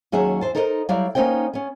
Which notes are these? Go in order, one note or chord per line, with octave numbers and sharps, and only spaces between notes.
D#2 F#3 C#4 G#4 E5 F#5
E2 C5 A5
D#4 A4 A#4 C5 C#5 D#5
F#3 G3 E4 G4 D5 F5
A#3 B3 C#4 D#4 C5 G5
B3 C#4